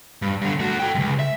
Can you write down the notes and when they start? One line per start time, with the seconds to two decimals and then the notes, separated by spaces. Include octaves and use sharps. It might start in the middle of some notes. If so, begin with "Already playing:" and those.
0.22 G2
0.41 G2 D3
0.60 A3 F#4
0.79 A4 G5
0.95 C#2 F#2
1.19 E5